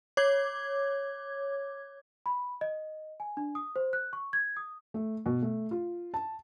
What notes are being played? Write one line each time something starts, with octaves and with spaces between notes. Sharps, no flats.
C#5 D6 G#6
B5
D#5
G#5
D4
D#6
C5
F#6
C#6
G#6
D#6
A3
B2
A3
F4
A5